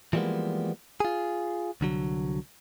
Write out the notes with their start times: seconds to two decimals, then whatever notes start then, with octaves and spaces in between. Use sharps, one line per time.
0.13 E3 F3 G3 G#3 A#3 B3
1.00 F4 G#4
1.81 C2 D3 F#3